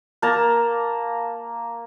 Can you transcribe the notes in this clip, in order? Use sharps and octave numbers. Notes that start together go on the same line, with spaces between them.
A#3 A5 A#5